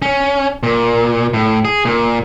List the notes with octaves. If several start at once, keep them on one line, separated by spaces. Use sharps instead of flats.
C#4
A#2
A2
G#4
A#2